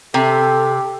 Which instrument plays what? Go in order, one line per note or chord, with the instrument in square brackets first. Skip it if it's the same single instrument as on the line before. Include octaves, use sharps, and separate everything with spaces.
[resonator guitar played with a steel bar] C3 [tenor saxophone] G4 [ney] A4